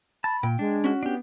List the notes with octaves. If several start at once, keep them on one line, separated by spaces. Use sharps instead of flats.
A5 B5
A#2 G5
G#3 D4
C#4 F#4
B3 D4 G4